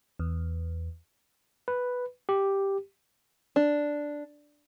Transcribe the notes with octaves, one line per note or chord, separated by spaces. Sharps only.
E2
B4
G4
D4